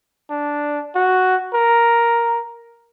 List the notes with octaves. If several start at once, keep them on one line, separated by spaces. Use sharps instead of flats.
D4
F#4
A#4